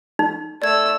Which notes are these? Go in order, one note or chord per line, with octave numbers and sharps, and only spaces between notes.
D#4
A3 D5 E6 G#6